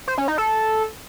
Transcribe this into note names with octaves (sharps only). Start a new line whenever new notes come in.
C5
C#4
D#4
A4